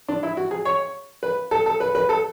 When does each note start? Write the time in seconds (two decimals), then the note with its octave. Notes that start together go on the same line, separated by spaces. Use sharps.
0.08 D4
0.23 E4
0.37 F#4
0.51 G#4
0.65 C#5
1.23 B4
1.51 A4
1.66 A4
1.80 B4
1.95 B4
2.09 A4